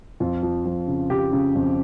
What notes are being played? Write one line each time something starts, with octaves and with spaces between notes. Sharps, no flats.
F2 F4
F3
F3
C#3
C#3 G4
C#3
F2